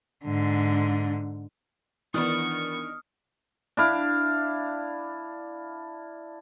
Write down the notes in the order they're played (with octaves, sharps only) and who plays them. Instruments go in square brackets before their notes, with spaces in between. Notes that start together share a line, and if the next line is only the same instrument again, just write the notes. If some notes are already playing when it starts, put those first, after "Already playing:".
[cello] G#2 D3
[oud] D#3 D4 [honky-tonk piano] E3 B3 [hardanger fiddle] C#6 [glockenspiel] D#6 F6
[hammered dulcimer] D4 E4 F5